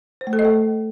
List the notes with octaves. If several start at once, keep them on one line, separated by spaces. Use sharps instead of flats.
C5
A3
A4
D#5
A3